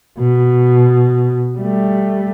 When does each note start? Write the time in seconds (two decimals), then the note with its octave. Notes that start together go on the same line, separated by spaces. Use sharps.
0.19 B2
1.58 G3 A3